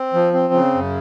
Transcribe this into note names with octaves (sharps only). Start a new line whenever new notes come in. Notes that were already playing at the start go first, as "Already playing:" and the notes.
Already playing: C4
F3
C4
C#3
F#2